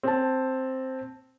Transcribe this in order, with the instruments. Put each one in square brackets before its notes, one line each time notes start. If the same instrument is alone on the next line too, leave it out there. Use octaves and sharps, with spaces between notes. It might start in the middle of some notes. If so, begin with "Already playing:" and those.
[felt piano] C4 A5